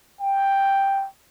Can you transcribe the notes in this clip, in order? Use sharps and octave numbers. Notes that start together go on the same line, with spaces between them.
G5